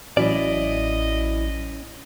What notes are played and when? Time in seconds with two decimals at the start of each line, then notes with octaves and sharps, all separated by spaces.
0.17 A1 F#3 C#4 E4 D5 D#5